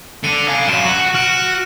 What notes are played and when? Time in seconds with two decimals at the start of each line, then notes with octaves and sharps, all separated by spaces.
0.24 D3 D4 C#7 D#7
0.49 F5 G#5
0.67 F#2 D7 E7
0.84 F#4
1.14 F#4 F6 D7 E7